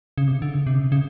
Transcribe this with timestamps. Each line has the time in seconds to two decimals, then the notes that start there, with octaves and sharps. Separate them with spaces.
0.18 C#3
0.27 C3
0.42 D3
0.54 C#3
0.67 C3
0.75 C#3
0.84 C3
0.92 C#3